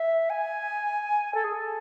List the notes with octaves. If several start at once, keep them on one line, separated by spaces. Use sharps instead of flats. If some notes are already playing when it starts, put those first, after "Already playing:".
Already playing: E5
G#5
A4
G#4
A4